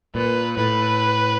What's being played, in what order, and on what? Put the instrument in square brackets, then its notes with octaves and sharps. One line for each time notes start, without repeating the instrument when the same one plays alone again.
[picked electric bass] A#2 [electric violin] B4
[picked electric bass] A2 [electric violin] B4